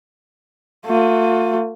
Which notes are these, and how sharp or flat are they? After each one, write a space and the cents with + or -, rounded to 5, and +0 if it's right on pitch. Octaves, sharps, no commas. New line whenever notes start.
A3 +45 F4 +35